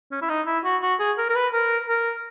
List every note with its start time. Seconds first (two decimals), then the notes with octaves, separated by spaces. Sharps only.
0.11 C#4
0.22 E4
0.29 D#4
0.46 E4
0.64 F#4
0.82 F#4
1.00 G#4
1.18 A#4
1.30 A#4
1.35 B4
1.53 A#4
1.88 A#4